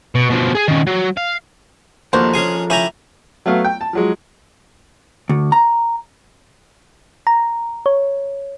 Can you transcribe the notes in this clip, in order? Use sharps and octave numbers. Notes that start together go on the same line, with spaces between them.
B2
B2 F3
G#4 G#5
D#3 C#4
F#3
F5
D#2 F3 D4 F#4 A4 A#4 C5
C#4 G#4 G#5
C#4 E4 G4 G#5 A#5
F#3 A3 B3 F5
G5
A5
F3 F#3 G#3
D2
A#5
A#5
C#5